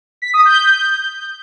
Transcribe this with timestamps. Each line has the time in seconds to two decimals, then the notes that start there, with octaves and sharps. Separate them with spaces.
0.22 B6
0.34 D#6
0.45 G6